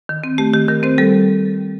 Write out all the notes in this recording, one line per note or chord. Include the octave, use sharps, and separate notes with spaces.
D#3
C4
A3 G4
D#3 G4
D#3 A#4
C4 C5
G3 A4